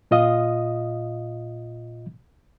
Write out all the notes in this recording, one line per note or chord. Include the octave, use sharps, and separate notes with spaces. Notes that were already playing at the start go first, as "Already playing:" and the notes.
A#2 F4 D#5 F5 D#6